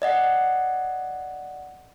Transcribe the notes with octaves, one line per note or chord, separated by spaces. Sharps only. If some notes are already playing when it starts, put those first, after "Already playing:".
D5 D#5 F#5